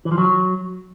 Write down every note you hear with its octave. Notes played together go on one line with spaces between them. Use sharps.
E3
F3
F#3